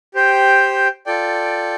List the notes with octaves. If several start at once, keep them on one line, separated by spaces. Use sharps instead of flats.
G4 C5 G5
F4 A4 D5 G5